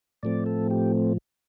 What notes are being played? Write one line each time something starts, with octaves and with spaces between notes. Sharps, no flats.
A2 F3 A3 C4 D5
A4
G4